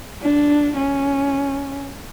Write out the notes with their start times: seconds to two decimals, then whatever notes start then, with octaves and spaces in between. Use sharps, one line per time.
0.22 D4
0.77 C#4